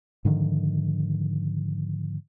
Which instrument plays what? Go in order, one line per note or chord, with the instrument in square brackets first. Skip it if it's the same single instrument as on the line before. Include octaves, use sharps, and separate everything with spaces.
[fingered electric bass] G#2 D3 D#3 F3